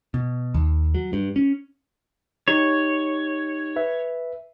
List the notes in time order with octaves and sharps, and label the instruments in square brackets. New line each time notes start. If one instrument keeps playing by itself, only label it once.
[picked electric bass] B2
D#2
F#3
G2
C#4
[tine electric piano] D#4 G4 [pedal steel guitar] C#5
[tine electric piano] B4 E5